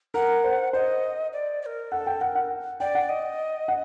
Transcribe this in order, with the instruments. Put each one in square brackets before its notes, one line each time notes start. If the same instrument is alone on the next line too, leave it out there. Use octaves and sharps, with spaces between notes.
[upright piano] A#4 [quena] F#5
[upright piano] C5
[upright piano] C5 [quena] D#5
[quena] D5
D5
A#4
[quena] A4 [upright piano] F#5
[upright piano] G5
[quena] A#4 [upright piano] F#5
[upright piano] F#5
[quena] D5 [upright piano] G5
[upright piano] F#5
[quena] D#5
[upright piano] F#5